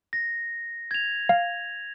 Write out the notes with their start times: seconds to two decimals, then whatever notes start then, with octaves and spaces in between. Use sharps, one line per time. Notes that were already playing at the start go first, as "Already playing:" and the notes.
0.13 A#6
0.91 G#6 F7
1.29 F5